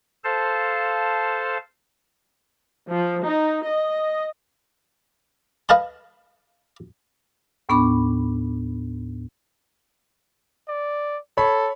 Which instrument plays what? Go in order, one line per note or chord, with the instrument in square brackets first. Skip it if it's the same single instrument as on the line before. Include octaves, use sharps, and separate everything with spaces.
[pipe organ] A4 C5 F5 A5
[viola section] F3
D#4
D#5
[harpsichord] B4 D#5 F5 A5 B5
[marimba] D#2 A2 B3 D4 B5 D6
[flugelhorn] D5
[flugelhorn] A4 [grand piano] C#5 B5